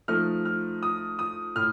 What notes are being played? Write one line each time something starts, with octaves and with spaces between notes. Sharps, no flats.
F3 A3 D#4 F6
F6
D#6
D#6
A2 F6